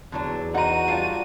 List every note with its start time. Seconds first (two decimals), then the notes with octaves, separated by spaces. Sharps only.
0.12 E2 D3 F#3 D4
0.54 D#4 F#4 F#5 A#5 D#7
0.88 G3 D4 F4